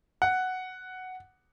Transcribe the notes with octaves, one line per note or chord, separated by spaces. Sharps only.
F#5